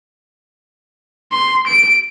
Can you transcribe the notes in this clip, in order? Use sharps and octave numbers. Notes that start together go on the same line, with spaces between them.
C6
D7